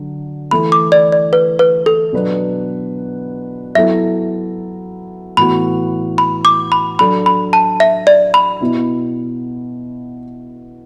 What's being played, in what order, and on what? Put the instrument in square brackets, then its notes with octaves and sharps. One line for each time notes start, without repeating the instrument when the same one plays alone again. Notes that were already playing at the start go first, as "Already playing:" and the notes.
Already playing: [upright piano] D3 F#3
[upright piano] E3 A3 E4 [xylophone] B5
[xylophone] D6
D5
D5
B4
B4
A4
[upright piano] B2 F#3 B3 D4 B4
[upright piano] F#3 B3 E4 A4 [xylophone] E5
[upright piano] A2 E3 B3 F#4 [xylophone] B5
[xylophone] B5
D6
B5
[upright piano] F#3 D4 A4 [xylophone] B5
[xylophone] B5
A5
E5
D5
B5
[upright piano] B2 B3 E4